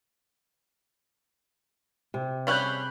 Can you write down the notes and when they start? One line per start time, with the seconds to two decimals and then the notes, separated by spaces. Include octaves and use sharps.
2.14 C3
2.47 G3 C#4 G#4 B5 F#6 G6